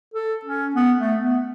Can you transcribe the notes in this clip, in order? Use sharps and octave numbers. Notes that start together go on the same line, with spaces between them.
A4
C#4
B3
A3
B3